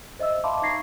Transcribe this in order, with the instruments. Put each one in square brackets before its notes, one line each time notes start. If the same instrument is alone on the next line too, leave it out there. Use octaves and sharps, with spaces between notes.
[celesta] C5 D#5 E5 E6
E5 F5 A5 B5 C6 D6
D#4 A#5 C#6 G#6 A#6 C7